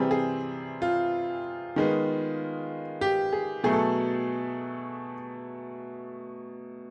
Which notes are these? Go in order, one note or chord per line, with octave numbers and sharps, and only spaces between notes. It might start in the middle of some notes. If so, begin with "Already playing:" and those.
Already playing: C3 E3 G3 C4 G#4
G#4
F4
D#3 G#3 B3
G4
G#4
B2 F#3 A3 G#4
A4